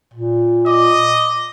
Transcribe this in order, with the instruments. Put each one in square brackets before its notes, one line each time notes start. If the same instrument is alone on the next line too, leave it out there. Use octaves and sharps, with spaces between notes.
[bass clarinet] A#2
[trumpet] D#5 [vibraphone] D6